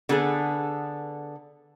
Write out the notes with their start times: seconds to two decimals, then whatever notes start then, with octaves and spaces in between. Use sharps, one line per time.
0.09 D3 B3 G#4 A4